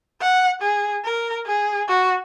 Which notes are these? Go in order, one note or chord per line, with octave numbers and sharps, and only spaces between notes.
F#5
G#4
A#4
G#4
F#4